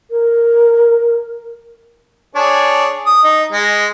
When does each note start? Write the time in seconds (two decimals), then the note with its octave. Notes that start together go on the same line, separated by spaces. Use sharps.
0.10 A#4
2.35 D4 G#4 C#5
3.06 D#6
3.24 D#4
3.52 G#3